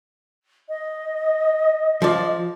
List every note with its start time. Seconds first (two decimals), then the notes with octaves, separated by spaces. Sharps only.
0.68 D#5
2.02 F3 D5